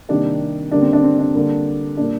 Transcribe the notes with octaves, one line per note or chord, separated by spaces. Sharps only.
C3 D#3 G3 A#3 D4
D3 G3 A#3 D4
C4
D4
C4
D4
D3 G3 A#3
A#2 G3 A#3 D4